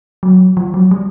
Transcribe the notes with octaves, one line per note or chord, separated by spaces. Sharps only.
F#3
F3
F#3
G3